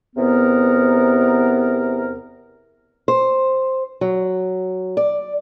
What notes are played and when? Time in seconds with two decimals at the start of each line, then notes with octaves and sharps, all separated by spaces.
0.16 E2 C3 B3 A#4
3.08 C5
4.01 F#3
4.97 D5